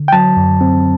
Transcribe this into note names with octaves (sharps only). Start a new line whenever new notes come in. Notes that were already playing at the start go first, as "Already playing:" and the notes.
Already playing: D3
G5
F#3 A5
F#2
C4